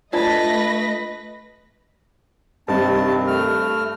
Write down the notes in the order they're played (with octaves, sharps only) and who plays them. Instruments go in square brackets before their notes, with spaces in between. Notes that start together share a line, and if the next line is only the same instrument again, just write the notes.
[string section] A3 D#5 A#6 [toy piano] D4 F4 D5 [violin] B4 [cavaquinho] A5
[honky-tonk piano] G2 [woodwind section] C3 D#3 C4 [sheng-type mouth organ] A5
[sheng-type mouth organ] A3 F6